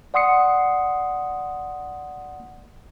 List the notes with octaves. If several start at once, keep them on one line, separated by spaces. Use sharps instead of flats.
D5 F#5 C6 D#6 C7 C#7